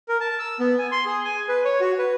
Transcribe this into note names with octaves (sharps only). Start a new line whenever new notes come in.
A#4
A5
E6
B3
G#5
C6
G#4
G#5
B4
C#5
F#4
B4